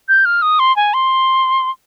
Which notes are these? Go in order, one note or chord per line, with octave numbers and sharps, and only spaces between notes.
G6
F6
D#6
C6
G#5
C6